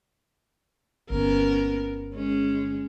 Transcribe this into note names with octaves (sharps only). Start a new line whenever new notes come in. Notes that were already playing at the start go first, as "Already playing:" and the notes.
G1 B3 C#4 A#4
G#3 C#4